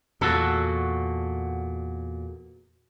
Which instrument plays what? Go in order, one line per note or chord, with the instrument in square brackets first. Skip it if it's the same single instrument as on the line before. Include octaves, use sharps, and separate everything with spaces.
[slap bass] E2 A#2 [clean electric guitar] F#4 A4